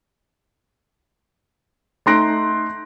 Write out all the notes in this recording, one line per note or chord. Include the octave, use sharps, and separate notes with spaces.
A3 D#4 C6 F#6 A#6 D7